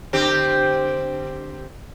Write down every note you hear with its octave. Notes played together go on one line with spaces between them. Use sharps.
D3 C4 G4